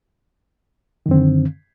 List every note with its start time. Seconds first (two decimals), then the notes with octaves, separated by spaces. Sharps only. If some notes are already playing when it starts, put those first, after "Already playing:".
1.06 D#3
1.09 F#2
1.11 C4
1.14 D3